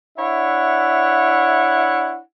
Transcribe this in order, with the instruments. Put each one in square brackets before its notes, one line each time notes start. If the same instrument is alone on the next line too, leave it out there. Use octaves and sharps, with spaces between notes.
[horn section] D4 E4 C#5 E5 F#5